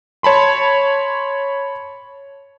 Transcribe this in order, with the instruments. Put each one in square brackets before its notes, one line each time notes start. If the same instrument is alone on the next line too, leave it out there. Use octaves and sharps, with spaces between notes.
[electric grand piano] C#5 A5 B5 C6